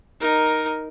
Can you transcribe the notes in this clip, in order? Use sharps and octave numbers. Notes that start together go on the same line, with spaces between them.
D#4 A#4